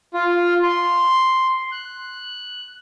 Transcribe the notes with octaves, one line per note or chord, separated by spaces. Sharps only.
F4
C6
F#6